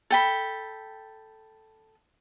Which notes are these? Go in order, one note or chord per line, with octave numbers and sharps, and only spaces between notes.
A4 G5 B5